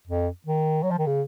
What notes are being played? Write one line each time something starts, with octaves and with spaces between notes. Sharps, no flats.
F2
D#3
F#3
F3
D#3
C#3